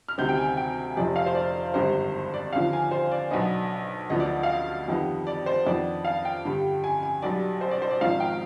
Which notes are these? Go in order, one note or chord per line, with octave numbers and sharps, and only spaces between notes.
F6
D2 C3 D#3 G3 C4 G6
G5
G#5
G5
F1 F2 C3 D5
F5
C5
D5
G#1 G2 D3 G3 C5
D5
D#2 D3 F3 F5
G#5
C5
D5
B1 B2 B3 D4 D#5
D2 D3 F3 B3 D4 D#5
D5
D#5
F5
D#5
F2 D#3 G3 B3
D5
C5
F2 D#3 B3 D4 D5
F5
G5
G2 D3 G3
G#5
G#5
B1 B2 G3 D5
C5
D5
C5
D5
G#1 G#2 F3 F5
G5